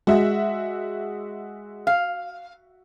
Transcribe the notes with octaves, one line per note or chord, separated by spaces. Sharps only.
G#3 F#4 E5
F5